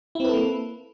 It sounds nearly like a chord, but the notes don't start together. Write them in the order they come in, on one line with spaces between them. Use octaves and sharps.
E4 C4 B4 A4 A#3